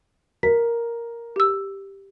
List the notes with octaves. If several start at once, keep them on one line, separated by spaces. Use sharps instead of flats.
A#4 B6
G4 E6